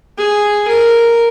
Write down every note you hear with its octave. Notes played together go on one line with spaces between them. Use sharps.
G#4
A#4